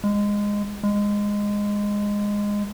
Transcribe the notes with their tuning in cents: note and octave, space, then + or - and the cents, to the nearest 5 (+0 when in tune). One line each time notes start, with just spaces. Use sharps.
G#3 -15
G#3 -15